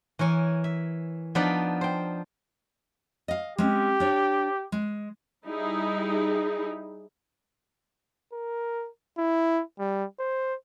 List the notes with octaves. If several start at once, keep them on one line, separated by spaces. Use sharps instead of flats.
E3 A#4 C#5 G#5
E5
F3 B3 D4 D#4 B4 D5
C5 G5
D#5 F5
G#3 C4 C#4 G4
D4 C#5
G#3
G3 D#4 E4 G#4
A#4
E4
G3
C5